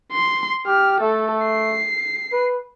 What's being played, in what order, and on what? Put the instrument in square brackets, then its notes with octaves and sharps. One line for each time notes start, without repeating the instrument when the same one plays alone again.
[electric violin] C6
[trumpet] G4 [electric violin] F6
[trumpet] A3 [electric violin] A4
[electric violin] C7
[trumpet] B4